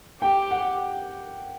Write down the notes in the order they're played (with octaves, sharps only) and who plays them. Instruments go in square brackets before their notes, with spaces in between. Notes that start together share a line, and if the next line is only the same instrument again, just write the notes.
[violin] G4 [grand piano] G5
[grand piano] F#5